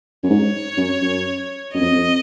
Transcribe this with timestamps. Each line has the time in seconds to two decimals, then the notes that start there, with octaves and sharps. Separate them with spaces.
0.24 F#2
0.30 G#2 C#5
0.77 F#2
1.02 F#2
1.74 F#2 D#5
1.81 F2
1.96 F2